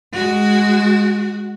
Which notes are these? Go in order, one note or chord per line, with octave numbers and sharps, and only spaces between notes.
G#3 F#4